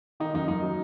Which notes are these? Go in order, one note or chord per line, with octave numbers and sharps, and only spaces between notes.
D#3 D#4
F#2 D#4
F#2 D#4
F#3